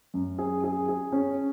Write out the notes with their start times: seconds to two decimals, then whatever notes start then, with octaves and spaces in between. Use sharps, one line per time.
0.14 F#2
0.39 G#4
0.64 G#4
0.88 G#4
1.12 C#4